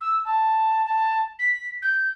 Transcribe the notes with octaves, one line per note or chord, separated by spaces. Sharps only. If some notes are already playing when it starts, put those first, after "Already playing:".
E6
A5
A5
B6
G6